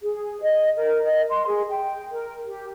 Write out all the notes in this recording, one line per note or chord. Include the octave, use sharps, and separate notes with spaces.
G#4
D#5
A#4
D#5
C6
G#4
G5
A#4
G4